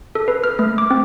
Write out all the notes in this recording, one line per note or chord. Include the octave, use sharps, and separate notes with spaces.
A4
B4
F6
A3
D6
C4